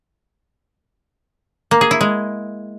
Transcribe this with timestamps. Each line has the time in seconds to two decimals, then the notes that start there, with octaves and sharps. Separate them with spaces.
1.71 A#3
1.81 G#4
1.91 E4
2.01 G#3